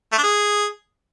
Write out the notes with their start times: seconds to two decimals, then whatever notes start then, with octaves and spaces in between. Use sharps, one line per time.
0.12 A3
0.18 D4
0.23 G#4